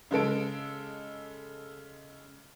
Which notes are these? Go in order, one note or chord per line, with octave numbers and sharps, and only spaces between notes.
C#3 G#3 A4 D7